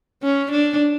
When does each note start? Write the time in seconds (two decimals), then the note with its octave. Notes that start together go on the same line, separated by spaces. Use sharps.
0.23 C#4
0.52 D4